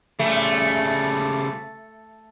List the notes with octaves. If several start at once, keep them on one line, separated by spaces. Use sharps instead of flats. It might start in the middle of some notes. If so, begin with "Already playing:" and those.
C#3 G3 A3